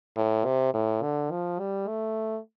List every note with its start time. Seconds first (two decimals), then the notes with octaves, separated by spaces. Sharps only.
0.16 A2
0.45 C3
0.74 A2
1.02 D3
1.31 F3
1.59 G3
1.88 A3